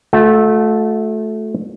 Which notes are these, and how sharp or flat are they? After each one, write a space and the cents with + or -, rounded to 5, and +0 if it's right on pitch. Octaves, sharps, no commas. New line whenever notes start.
A3 -15 F#4 -45